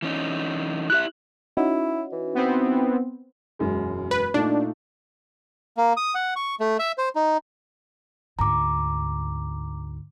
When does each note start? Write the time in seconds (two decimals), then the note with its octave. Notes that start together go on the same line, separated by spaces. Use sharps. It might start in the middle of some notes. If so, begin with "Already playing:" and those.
0.02 E3 C#4 D#4
0.90 E4 G4 E5 F#6
1.57 C#4 D#4 E4 F#4
2.12 E3
2.35 B3 C4
3.59 E1 F#2 G#3
4.11 B4
4.34 A#2 A3 D4 D#4
5.77 A#3
5.97 D#6
6.15 F#5
6.36 C#6
6.60 A3
6.79 E5
6.98 C5
7.16 D#4
8.39 D2 G#2 A#5 D6